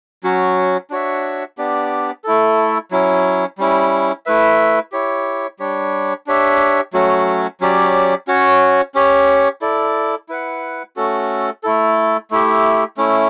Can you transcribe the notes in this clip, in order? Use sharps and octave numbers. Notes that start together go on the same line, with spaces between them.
F#3 C#4 F#4
D4 F#4 C#5 E5
B3 D4 G4 D5
A3 E4 A4
F#3 C#4 E4
G3 C#4 E4
A3 E4 B4 E5
E4 G4 C#5
G3 D4 G4 C#5
D4 G4 C#5 E5
F#3 A3 C#4 F#4
F#3 C#4 G4 D5
C#4 F#4 C#5
C#4 G4 C#5
E4 A4 D5
E4 B4 F#5
A3 C#4 F#4 A4
A3 E4 A4
A3 E4 G4
A3 C#4 E4